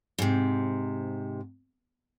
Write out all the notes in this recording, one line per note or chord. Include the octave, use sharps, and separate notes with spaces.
G#2 C3